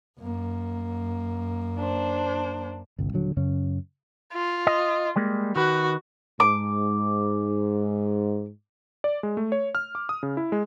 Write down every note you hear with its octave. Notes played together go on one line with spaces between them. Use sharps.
F#2 A#3
D4 C5
G1 C2
D#1 D3 F#3
F#2 C#3 C#4
F4
D#5
G3 G#3 A#3
D#3 F#4 B4
G#2 D6
D5
G#3
A3
C#5
F6
D6
D#6
C#3
E4
G#3